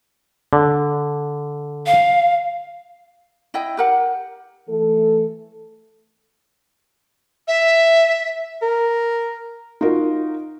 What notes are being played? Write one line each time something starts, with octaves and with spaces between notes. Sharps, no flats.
D3
F5
E4 D#5 G5
G4 A#4 F#5
E3 A3 A4
E5
A#4
D#4 F4 F#4 A#4